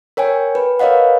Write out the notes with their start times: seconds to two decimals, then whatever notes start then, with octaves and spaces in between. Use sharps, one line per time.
0.17 A#4 C#5 G5 G#5
0.55 B4
0.80 A#4 B4 C#5 D#5 F5 F#5